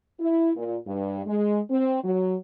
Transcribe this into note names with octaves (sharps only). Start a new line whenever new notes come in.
E4
A#2
G2
G#3
C4
F#3